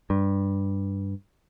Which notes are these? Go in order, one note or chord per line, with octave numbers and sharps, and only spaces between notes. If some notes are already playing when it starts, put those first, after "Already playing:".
G2